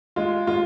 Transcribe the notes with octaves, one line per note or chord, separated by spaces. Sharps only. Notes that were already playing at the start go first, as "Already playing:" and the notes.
G#3 F4
G#3 F4